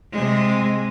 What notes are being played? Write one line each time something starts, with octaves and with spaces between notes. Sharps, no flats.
C3 G#3